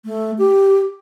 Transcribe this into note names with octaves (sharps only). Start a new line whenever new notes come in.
A3
G4